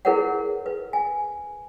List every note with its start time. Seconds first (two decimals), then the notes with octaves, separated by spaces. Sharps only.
0.05 E4 G#4 A#4 B4 C#5 F#5
0.66 B4
0.93 G#5